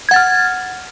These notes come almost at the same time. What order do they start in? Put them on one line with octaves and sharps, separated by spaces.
G#6 F#5 A6 F6